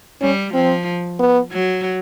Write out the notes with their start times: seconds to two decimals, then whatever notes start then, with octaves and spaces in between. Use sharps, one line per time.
0.21 G3 C#4
0.54 F3 C4
1.19 B3
1.52 F#3